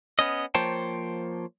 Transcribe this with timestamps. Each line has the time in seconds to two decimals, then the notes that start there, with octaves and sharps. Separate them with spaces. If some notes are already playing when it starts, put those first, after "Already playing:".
0.19 B3 C#4 D#5
0.55 F3 A#3 C5 C#5 G5 A5